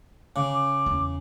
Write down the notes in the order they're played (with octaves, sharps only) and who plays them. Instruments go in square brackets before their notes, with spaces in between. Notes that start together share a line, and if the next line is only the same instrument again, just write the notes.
[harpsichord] C#3 [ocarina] D6
[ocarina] D6
[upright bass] E2 C#4